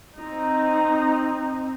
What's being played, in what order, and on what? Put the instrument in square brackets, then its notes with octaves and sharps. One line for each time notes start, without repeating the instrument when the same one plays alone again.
[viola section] C4 D#4